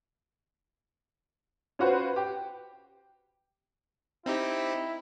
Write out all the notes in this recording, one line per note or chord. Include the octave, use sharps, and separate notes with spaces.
C#4 F4 F#4 B4 C5
G4
C4 D#4 E4 G4